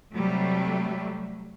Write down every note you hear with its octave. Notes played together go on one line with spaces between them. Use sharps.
C3 F#3 G3 A3